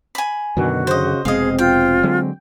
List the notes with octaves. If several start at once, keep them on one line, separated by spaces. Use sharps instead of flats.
G#5 B5
F#2 B2 D3 D#3 F#4
C#3 C5 D#5
F1 B2 G#3 C4 G#4 D#5 F5
F4 G5
D3 F#3 G#3